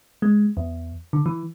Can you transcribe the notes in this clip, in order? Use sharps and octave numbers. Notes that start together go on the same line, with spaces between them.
G#3
E2
D3
E3